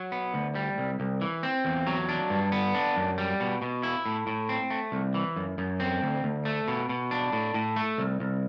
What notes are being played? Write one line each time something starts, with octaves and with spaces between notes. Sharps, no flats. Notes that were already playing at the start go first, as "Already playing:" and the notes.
Already playing: F#3
B3
D2
G3
C2
C2
E3
C4
E2
F#3
D4
G2
B3
D4
F#2
G3
B2
B2
E4
A2
A2
C4
A3
C2
E3
F#2
F#2
C4
D2
D2
A3
B2
B2
D4
A2
A2
A3
C2
C2